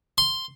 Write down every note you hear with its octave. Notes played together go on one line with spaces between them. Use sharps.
C6